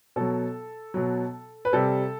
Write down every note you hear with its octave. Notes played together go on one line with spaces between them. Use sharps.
B2 F#3 A4
B2 F#3
B4
C3 G3 A4